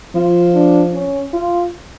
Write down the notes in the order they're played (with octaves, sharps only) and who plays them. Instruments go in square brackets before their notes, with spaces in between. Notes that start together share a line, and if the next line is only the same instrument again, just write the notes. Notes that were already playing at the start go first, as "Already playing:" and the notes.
[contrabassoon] F3 [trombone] F4
[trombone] D4
C#4
F4